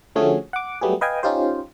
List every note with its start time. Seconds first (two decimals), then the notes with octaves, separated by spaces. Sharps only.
0.16 D3 F3 A3 C#4 F#4 G#4
0.53 F#5 D6
0.81 F#3 G3 A3 B3 G4 G#4
1.01 B4 D#5 F5 G5 G#5
1.23 C#4 D#4 F4 G4 C5